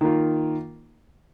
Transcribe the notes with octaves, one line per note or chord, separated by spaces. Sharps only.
D#3 A#3 F4